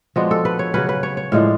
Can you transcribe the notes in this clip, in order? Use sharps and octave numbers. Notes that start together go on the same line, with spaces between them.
F3 G#3 B3 D4 F#4
A4
B4
C#5
C#3 F#3 C#4 B4
B4
C#5
C#5
A2 F3 G#3 D4 F5